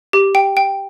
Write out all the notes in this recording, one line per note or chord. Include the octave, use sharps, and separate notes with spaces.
G4
G5
G5